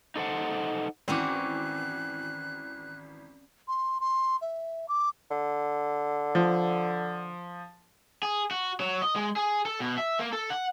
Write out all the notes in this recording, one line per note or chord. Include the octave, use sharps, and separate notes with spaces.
D#4 A4 C5 F#5
G#1 E3 C4 C#4 F#4 D6 F#6
C6
C6
E5
D6
D3
F3
G#4
F#4
F#3
D#5
G#3
G#4
A4
B2
E5
A#3
A4
F#5